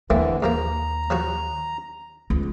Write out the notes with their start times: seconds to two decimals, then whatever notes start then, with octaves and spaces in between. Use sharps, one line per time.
0.10 D#2 D3 E3 A3 A#3 C4
0.42 G#2 F3 A#3 A#5
1.10 F3 F#3 F#4
2.30 C#2